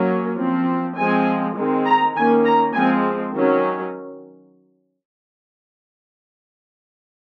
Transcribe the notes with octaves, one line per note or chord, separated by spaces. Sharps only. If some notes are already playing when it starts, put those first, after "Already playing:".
Already playing: F#3 A#3 C#4
F3 C4
F3 G#3 C4 G#5
D#3 G#3 C4
A#5
D#3 A#3 C#4 G#5
A#5
F3 G#3 C4 G#5
D#3 F#3 C#4